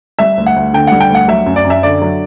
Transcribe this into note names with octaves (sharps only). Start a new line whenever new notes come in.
G3 E5
D2
F#5
D2
D3 G5
G3 F#5
G5
D2 F#5
F#3 E5
F#2
D5
F#2
E5
D3 D5
F#3